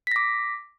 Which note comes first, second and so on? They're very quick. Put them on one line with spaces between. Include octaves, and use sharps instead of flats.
B6 A#6 D6